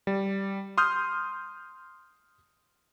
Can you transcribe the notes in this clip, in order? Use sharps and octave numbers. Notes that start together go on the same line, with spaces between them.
G3
C6 D#6 F6 G6